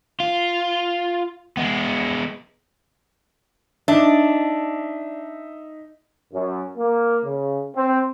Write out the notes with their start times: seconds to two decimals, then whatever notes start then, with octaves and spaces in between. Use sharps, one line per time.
0.20 F4
1.57 G#3 B3
3.88 D4 D#4 E5
6.33 F#2
6.77 A#3
7.24 C#3
7.76 C4